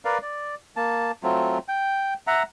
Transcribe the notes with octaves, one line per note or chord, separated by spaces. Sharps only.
A#4 B4 D5 F5
D5
A#3 A5
F#3 A3 C4 F4
G5
E5 F#5 A#5